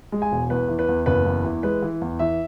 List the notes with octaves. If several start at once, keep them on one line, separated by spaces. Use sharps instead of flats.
G#3
G#5
E1
E2 B4
E3
B4
E2
F#1 B4
E2
E3
G#3 B4
E3
E2
E3 E5